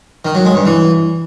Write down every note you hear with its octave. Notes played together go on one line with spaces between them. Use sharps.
D#3
F#3
G#3
G2
E3